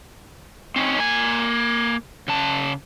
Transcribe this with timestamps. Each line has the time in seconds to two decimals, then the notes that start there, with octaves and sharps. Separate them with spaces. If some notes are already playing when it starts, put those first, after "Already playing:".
0.76 C4 C#4 D#4
0.99 A#3 G#5
2.28 C#3 A5